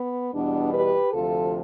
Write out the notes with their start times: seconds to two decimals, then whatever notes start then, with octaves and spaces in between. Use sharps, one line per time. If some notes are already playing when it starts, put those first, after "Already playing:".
Already playing: B3
0.33 E2 B2 G3 B3 D4
0.74 G4 B4
1.13 D2 C3 F3 F4 A4